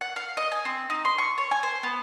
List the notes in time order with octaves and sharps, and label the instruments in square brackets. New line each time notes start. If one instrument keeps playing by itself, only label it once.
[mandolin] F#5
F5
D#5
G#5
C4
D#4
C6
C#6
C#5
G#5
C5
B3